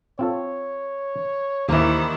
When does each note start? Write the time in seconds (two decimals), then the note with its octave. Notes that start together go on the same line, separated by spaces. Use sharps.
0.19 C4 F4 A4 C#5
1.69 D#2 D#3 E3 G3 A#3 E4 C5